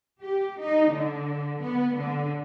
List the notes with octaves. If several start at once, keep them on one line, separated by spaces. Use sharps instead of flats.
G4
D#4
D3
B3
D3